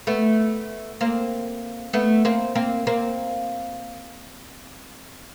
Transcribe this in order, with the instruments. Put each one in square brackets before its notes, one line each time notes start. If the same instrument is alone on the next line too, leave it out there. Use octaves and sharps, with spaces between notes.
[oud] A3 B3
A#3 C4
A3 B3
A#3 C4
A#3 C4
A#3 C4